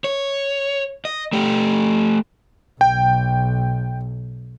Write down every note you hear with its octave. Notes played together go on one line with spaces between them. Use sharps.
C#5
D#5
A3 G4
B1 G5